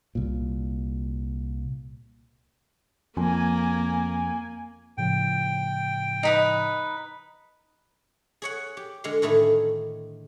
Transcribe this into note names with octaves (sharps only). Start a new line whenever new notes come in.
C2 A#2
F2 A#3 G#5
A2 C#3 F3 G5
D#4 B4 D#6
G#4 C#5 F#5
G4
D3 G#3 F5 C6
A2 D3 D#3 A3 G#4